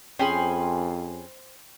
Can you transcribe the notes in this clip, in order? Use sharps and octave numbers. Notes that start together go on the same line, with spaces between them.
F2 C#4 G#4 C5 G5 B5 C6